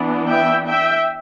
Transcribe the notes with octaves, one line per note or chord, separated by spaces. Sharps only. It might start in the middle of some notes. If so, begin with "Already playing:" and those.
Already playing: E3 B3 D4
E5 G5
E5 G5